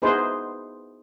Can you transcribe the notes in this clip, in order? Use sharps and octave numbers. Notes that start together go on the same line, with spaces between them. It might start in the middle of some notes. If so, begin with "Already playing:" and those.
B3 D#4 E4 G#4 B4 C5